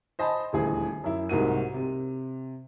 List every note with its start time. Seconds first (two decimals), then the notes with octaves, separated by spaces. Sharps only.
0.19 C5 D#5 G#5 A5 B5
0.53 D#1 D2 E3 G#4
1.04 F#2 E4
1.29 C2 G#2 A#3 F#4 D#7
1.74 C3